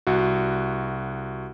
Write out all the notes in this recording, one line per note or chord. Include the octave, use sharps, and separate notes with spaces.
C2 F#4